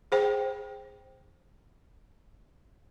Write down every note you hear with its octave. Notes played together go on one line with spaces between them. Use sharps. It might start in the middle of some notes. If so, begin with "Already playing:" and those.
G#4 C5 G5